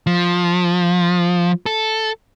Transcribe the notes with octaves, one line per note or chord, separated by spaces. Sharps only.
F3
A4